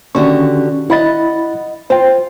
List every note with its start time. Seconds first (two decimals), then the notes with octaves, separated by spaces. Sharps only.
0.15 D3 D#3 C#4 F#4 G4 C#6
0.90 E4 D#5 F#5 B5 A6
1.90 F4 C5 G5